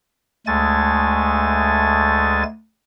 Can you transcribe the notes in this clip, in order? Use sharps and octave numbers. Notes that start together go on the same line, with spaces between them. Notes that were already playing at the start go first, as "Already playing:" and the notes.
D2 G#3 A3 G#5 A6